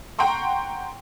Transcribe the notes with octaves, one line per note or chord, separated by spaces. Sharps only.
F#5 G5 A#5 C6 C#6